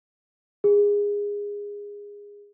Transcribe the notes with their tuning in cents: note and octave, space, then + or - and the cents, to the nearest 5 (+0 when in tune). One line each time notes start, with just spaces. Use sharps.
G#4 -20